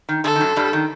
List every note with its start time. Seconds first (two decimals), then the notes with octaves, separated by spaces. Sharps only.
0.09 D#3
0.24 D3 A4
0.36 D#3
0.41 F#2 F#3
0.56 G2 G3
0.73 D#3